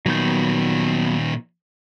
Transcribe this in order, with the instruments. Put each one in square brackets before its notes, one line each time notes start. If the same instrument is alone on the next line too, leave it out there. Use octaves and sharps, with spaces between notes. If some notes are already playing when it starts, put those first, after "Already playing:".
[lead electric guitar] A#2 D#3 [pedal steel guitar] F#3 B3 G6